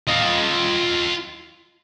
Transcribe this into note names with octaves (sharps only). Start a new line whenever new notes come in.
F4 D#5